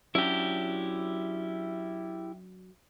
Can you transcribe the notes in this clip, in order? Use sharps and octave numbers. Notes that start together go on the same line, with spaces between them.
F#3 C#4 D4 E4 G4